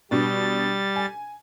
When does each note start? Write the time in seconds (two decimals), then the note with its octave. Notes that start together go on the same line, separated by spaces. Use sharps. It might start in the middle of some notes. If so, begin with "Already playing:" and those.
0.11 B2 G3 D4 A6
0.96 G#5